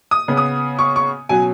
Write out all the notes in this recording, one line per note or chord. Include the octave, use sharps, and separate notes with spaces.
D#6
C#3 B3
D#6
C#6
C#6
B2 F#3 C#4 G#5